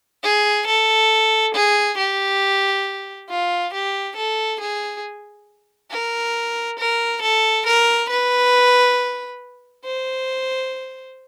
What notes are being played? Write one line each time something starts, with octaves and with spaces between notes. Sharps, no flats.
G#4
A4
G#4
G4
F4
G4
A4
G#4
A#4
A#4
A4
A#4
B4
C5